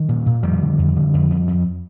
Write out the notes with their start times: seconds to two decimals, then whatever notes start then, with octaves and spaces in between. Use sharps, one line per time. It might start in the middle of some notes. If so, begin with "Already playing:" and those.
Already playing: D#3
0.09 A#2
0.26 A#2
0.42 F2 D#3 G3
0.61 D3
0.78 F2
0.96 D3
1.13 F2
1.31 F2
1.48 F2